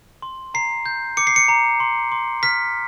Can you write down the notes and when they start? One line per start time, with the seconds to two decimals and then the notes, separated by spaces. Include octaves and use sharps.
0.22 C6
0.54 A#5 C7
0.86 G6
1.17 D6 C#7
1.27 C7
1.36 C#7
1.48 A#5
1.80 C6
2.12 C6
2.43 F6 B6